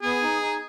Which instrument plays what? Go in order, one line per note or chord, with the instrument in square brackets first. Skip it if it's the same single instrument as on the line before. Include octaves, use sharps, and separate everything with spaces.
[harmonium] B3 [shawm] G#4
[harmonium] D#4
D#4